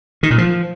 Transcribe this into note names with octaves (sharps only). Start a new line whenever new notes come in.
D#3
A#2
F3